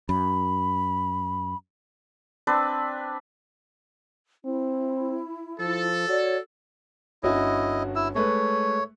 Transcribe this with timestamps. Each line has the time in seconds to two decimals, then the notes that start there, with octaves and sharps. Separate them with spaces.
0.09 F#2 B5
2.47 C4 D4 B4
4.45 C4 E4
5.60 F3 A4
6.09 F#4 C#5 D5
7.23 G1 C#4 E4 F#4 D#5
7.96 E4 E6
8.15 G#3 A3 B4 C#5